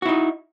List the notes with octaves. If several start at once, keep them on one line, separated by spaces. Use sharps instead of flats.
D#4 E4 F#4